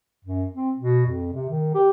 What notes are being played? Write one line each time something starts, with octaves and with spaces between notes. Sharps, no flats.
F#2
C4
B2
F2
C3
D#3
G4